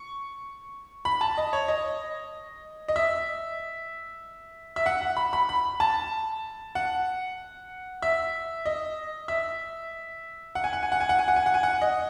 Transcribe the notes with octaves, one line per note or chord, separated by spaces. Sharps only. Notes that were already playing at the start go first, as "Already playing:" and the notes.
Already playing: C#6
B5
A5
D#5
C#5
D#5
D#5
E5
E5
F#5
F#5
B5
B5
B5
A5
F#5
E5
D#5
E5
F#5
G#5
F#5
G#5
F#5
G#5
F#5
G#5
F#5
G#5
F#5
G#5
F#5
D#5